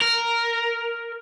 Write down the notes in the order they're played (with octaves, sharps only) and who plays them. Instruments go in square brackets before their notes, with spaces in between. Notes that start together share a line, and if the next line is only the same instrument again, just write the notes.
[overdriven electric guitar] A#4